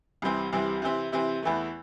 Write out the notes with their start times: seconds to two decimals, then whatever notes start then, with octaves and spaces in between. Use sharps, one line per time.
0.22 C2 C3 E3 C4
0.53 C2 C3 E3 C4
0.82 C3 E3 C4 E4
1.12 C3 E3 C4 E4
1.42 E2 E3 A3